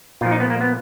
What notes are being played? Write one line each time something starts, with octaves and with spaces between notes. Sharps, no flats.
A#2 F3 F4
D#4
B3
A#3
B3